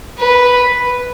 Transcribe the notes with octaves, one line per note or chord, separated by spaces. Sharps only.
B4